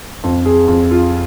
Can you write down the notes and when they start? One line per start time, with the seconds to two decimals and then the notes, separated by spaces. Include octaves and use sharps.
0.24 F2
0.46 G#4
0.68 F2
0.91 F4